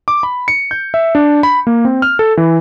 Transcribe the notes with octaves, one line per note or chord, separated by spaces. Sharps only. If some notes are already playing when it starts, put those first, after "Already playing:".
D6
B5
C#7
G6
E5
D4
B5
A#3
C4
F6
A4
E3